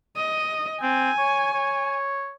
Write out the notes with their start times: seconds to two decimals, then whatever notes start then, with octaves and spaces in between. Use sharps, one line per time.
0.16 D#5
0.82 C4 G#5
1.18 C#5
1.53 C#5